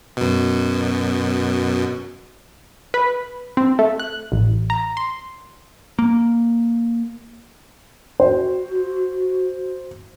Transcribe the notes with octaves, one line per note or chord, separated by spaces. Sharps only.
F#2 B2
B4
C4
A3
F#6
A1
A#5
C6
A#3
F#4 C5